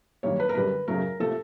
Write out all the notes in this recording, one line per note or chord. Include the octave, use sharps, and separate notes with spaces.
G2 D#3 F#3 A#3 C#5
B4
A#4
F#2 D3 G3 B4
F#2 C#3 F#3 A3 A#4
C3 F3 A3 A4